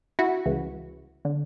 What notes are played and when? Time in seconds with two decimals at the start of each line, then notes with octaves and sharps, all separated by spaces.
0.19 E4 F#4
0.46 C#2 C#3 E3
1.25 D3